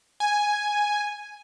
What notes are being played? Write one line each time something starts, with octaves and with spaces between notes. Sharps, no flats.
G#5